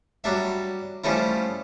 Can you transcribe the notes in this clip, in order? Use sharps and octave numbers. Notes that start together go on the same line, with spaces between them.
F#3 G3 D4 E5
F3 G3 A3 C#4 E4